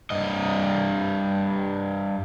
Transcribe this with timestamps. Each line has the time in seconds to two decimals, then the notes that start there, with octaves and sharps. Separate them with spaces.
0.10 G2 D#5